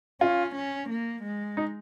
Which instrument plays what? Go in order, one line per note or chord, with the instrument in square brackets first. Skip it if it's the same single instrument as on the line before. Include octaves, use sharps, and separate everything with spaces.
[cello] C#4 [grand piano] F4
[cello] C#4
A#3
G#3
[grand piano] D#4